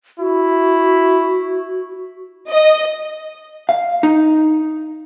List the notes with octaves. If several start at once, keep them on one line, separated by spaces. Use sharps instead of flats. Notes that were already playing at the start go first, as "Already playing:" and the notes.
E4 F#4
D#5
F5
D#4